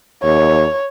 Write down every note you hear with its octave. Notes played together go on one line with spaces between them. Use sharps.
D#2 C#5